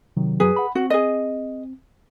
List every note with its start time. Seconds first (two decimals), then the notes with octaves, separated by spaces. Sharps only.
0.17 C3 D#3 F#3
0.40 F#2 F#3 G#4 B4
0.56 F#5 B5
0.75 C4 F#4
0.90 G#4 D#5